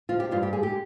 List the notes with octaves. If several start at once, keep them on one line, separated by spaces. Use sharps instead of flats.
F3 F4
G4
G2 F4
G4
G#3 G#4
G4